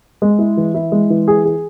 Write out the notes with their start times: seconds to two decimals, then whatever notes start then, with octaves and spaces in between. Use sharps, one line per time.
0.22 G#3
0.39 E4
0.57 E3
0.74 E4
0.92 G#3
1.10 E3
1.28 G#4
1.45 G#4